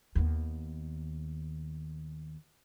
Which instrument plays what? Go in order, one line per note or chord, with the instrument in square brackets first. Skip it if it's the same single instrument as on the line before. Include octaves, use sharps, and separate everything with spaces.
[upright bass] D#2 B3